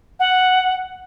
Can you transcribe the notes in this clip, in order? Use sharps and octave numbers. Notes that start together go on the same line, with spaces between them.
F#5